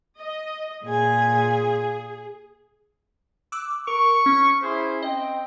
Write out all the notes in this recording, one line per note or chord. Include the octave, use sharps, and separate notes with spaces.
D#5
A#2 G#4 G#5
D6 E6 F#6
A#4 C#6
C#4
E4 G#4 C5
C4 D#5 G5